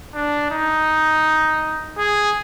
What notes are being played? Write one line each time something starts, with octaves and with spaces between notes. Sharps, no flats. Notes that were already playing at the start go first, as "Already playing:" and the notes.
D4
D#4
G#4